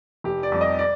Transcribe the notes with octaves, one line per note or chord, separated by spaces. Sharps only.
F1 G4
D5
F2 C3 G3
D#5
D5